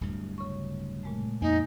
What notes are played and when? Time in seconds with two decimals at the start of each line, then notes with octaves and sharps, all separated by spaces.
0.01 D1 G2
0.38 C#3 C#6
1.03 A#2 G#3 A3
1.41 F2 A#3 D#4 G#5